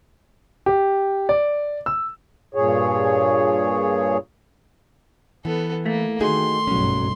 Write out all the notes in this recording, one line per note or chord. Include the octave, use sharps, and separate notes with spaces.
G4
D5
E6
G2 A#2 G#4 C#5
E3 B3 A4
A3 A#3
D#3 D#4 F#4 G#4 C6
F#1 B1 G2 F#3 C#4